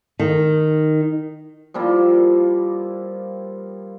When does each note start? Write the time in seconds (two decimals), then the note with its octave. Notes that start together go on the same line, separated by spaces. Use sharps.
0.20 D#3
1.74 F3 G3 A#3 E4